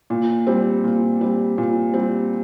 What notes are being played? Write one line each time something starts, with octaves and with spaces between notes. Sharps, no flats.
A#2
G3 C4
A#2
G3 C4
A#2
G3 C4